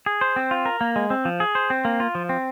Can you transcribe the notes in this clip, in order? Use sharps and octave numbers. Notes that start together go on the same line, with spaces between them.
G#4
C5
C4
F4
A#4
A#3
G#3
C4
F3
G#4
C5
C4
A#3
F4
F3
C4